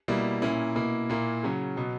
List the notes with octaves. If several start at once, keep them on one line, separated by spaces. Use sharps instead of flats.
B2 G3 A#3 E4
A#2 A#3 C#4 E4
B2 A#3 E4
A#2 A#3 E4
C#3 F#3 C#4
B2 F#3 B3